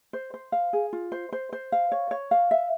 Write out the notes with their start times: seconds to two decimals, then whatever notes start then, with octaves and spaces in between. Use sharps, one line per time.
0.13 C5
0.34 C5
0.52 F5
0.73 G#4
0.93 F4
1.12 C5
1.32 C5
1.53 C5
1.72 F5
1.92 C#5
2.11 C#5
2.31 F5
2.51 E5